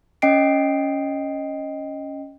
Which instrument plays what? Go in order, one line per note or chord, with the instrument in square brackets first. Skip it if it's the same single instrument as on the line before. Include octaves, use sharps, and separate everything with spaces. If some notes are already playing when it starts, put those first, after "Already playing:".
[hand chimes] C#4 D#5 G5 C7 D7